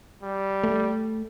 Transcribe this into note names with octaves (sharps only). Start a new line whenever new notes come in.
G3
A3